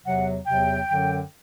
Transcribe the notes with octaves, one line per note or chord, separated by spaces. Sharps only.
E2 C3 F#3 F#5
E2 C3 F#3 G5
F#2 D3 F#3